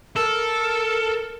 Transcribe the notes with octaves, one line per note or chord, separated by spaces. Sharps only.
A4 A#4